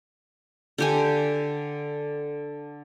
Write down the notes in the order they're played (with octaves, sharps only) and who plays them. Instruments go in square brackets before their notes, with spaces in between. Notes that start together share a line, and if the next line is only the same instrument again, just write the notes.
[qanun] D3 G4 G#5